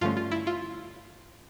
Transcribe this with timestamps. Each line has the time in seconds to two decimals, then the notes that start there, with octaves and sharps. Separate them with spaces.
0.01 G2 D3 F3 A3 C#4 F4
0.17 F4
0.31 E4
0.47 F4